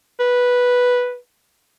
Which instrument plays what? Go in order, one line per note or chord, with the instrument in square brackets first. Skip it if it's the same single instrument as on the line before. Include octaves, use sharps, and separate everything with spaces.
[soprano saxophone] B4